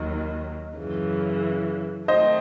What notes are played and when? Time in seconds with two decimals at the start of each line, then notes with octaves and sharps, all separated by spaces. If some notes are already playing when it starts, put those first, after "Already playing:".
Already playing: D#2 D#3 F#3
0.77 F#2 C#3 E3
2.08 D#3 A3 C4 C5 D#5